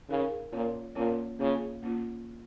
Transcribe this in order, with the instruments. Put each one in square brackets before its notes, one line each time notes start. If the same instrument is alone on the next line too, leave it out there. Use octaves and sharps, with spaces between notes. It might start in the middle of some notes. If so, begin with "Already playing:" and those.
[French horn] C#3 [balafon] D#4 A#4 F5
[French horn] A#2 [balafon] A#3 C#4 F4 C#5
[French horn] A#2 [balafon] A#3 C#4 F4 C#5
[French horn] C#3 [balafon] A#3 C#4 F4 C#5
[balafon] A#3 C#4 F4